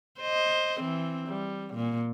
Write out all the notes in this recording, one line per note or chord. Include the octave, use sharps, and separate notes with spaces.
C5 D#5
E3 C4
G3
A#2